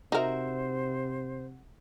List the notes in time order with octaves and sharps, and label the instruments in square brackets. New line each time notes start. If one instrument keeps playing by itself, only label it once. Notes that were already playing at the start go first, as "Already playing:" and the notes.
[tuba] C3 [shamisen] D#4 A#4 [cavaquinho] F#4 E5 [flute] C5